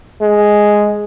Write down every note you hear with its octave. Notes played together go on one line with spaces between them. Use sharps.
G#3